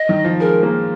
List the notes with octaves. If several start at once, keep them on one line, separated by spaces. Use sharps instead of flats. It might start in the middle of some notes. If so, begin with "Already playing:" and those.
Already playing: D#5
D#3
F3
G#3 A#4
A#3